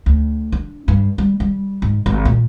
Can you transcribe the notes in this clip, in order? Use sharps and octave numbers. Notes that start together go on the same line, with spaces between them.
D2
D4
G2
G3
G3
G#2
G#1
A#2